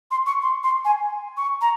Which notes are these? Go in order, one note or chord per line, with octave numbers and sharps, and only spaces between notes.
C6
C#6
C6
C6
G#5
C#6
A#5